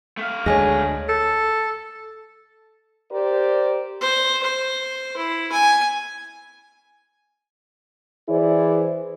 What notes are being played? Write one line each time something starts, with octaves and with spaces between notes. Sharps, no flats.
A3 F5
D2 G#3 C#5 G#5 A#6
A4
G4 A#4 C5 D5
C5
C5
E4
G#5
E3 E4 G#4 C5 D5